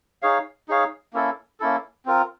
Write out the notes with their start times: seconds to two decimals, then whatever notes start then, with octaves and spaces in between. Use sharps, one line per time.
0.22 D#4 G#4 C#5 F5
0.68 D#4 G#4 C#5 F5
1.13 A#3 C#4 E4 A4
1.60 A#3 C#4 E4 A4
2.06 C4 F4 A#4